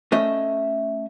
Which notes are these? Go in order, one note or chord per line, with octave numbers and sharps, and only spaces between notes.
A3 C#4 D#5 E5